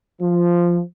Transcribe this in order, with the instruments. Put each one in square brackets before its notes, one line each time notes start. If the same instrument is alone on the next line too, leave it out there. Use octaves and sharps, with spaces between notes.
[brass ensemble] F3